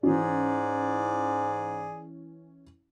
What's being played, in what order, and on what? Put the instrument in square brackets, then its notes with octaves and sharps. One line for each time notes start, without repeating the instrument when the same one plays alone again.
[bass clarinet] G#2 [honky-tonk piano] E3 C#4 [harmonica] G#4 D5